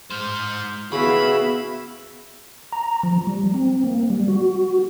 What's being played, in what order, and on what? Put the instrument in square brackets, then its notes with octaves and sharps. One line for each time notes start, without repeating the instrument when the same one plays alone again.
[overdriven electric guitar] G#3 C5 [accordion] F6 G6
[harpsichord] C#3 [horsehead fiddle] B3 E5 [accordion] E4 F#4 F5 [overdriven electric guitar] B5
[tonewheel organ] A#5
F3
G3
C4
A#3
G3
F#4